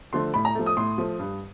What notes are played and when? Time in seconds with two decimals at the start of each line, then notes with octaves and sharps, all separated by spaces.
0.13 D3 F3 A3 C6
0.34 A2 B5
0.45 A#5
0.55 F3 A3
0.66 D#6
0.77 A2 C6
0.98 F3 A3
1.19 G2